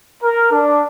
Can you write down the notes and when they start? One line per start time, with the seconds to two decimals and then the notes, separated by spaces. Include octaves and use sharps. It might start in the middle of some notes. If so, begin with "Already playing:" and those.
0.23 A#4
0.52 D4